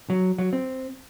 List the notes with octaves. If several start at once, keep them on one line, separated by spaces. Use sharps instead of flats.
F#3
F#3
C4